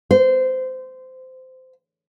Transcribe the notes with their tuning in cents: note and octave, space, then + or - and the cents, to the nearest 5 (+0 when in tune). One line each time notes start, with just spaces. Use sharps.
C5 -20